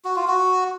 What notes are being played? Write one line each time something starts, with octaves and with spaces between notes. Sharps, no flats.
F#4
F4
F#4